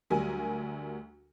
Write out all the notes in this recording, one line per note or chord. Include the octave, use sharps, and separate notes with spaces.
D2 F#3 G3 A#4 G#5